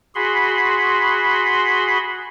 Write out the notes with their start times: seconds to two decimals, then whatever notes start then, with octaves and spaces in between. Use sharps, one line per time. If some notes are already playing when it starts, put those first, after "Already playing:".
0.15 F#4 G#4 B5 C6